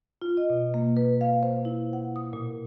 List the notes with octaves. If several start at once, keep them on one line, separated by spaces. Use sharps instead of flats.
F4
D#5
B2
A#3
B4
F5
C5
E4
F#5
D#6
A#2